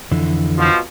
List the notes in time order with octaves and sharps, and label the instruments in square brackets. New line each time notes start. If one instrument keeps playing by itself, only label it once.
[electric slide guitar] F2 D3 E3
[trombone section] B2 F3